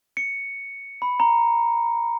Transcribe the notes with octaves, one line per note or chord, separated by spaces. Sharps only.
C#7
B5
A#5